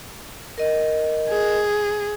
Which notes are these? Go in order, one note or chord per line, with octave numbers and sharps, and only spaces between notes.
A#4 D#5
G#4